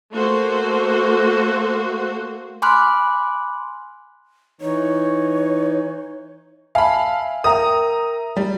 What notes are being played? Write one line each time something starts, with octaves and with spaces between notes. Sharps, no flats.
A3 A#3 F#4 C5
G#5 B5 C6 D6 F6 F#6
E3 D#4 C#5
E5 F5 G#5 A5 B5
A#4 E5 G5 A#5 D#6
G3